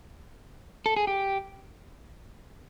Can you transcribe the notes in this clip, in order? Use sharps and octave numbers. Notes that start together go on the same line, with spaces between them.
A4
G#4
G4